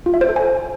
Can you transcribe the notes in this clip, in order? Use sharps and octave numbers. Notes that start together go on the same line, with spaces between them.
F4
E5
C5
A4
G#5